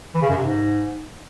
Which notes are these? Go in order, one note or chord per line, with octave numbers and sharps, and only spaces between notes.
E3
C#3
F#2
C3
G#2